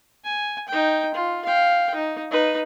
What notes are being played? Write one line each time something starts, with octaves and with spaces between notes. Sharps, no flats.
G#5
D#4 G5
F4
F5 G5
D#4
D#4 B4